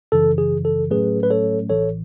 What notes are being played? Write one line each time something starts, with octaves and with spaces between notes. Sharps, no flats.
F#2 C#3 E3 A4
G#4
A4
A2 F#3 A3 C#4 G#4 B4
B4
A4 C#5
A1 A2 E3 A4 C#5